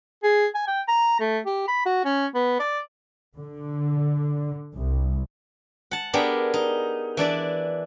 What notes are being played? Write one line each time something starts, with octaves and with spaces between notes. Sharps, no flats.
G#4
G#5
G5
A#5
A3
G4
B5
F#4
C#4
B3
D5
D3
C2
F#5 A5
B3 D4 G4 G#4 A#4
D#4
E3 D4 D5 E5